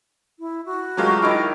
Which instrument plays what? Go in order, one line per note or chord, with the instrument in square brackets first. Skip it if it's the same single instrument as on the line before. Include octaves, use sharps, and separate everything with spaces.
[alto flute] E4
F#4
[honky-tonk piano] F#3 G#3 F4 [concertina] A3 G4 A#4
[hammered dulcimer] D#3 E4 [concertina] D#5 D6 F6